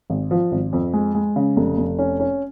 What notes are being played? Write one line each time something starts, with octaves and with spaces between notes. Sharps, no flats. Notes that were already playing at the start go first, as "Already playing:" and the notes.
G#1
F3
G#1
F2
G#3
G#3
C#3
F1
F1
C#4
C#4